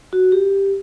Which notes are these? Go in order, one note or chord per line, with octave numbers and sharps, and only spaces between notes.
F#4
G4